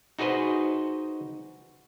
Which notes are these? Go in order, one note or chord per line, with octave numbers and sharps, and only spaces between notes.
D#4 F#4 G#4 B4 C5 D#5